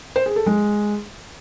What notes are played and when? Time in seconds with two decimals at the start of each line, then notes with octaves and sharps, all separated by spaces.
0.16 C5
0.26 G#4
0.36 A4
0.46 G#3